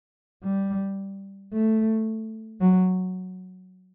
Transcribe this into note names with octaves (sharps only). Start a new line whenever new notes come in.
G3
A3
F#3